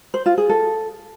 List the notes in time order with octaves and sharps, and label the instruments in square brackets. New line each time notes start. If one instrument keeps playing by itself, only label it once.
[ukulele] C5
F4
G#4
A4